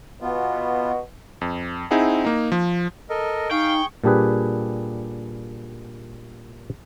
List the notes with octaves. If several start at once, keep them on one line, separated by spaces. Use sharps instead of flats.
B2 B3 F4
F2
C4 D#4 E4 G#4 F#5
A#3 D#4
F3
A4 A#4 D#5
D#4 G#4 F5 G5 C#6
A#2 G3 D4 G4 G#4 B4